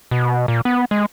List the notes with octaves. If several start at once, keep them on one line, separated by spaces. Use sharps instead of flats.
B2
A#2
B3
G#3